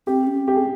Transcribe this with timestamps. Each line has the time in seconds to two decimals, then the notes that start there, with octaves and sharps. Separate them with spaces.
0.07 C4 G4
0.27 C#4
0.47 C4 G4
0.56 G#4